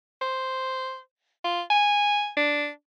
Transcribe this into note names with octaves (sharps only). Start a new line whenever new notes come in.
C5
F4
G#5
D4